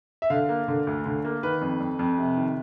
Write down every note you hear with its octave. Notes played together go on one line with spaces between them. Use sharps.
E5
D3 F5
A#3
D3
D2
D3
A#3
D#3 B4
F2
F2
F2
C3
D#3